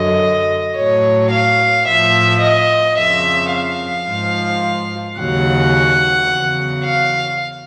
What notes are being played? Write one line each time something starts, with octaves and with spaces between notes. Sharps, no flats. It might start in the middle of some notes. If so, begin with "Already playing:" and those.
Already playing: F#2 D3 F#3 D#5
A2 F#3 C#5
F5
A2 F3 E5
D#5
F2 C#3 F3 E5
F5
G#2 F3
D#2 C#3 F#3 F#5
E2 C#3 F#3
F5